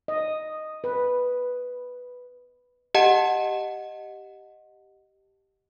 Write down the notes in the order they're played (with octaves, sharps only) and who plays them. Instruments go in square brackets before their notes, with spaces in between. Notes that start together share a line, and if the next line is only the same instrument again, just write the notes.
[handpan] D#5
B4
[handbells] G4 D#5 F#5 A5